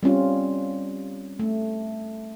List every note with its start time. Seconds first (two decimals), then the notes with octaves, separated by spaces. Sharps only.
0.03 G3 C4 C#4 F4
1.39 A3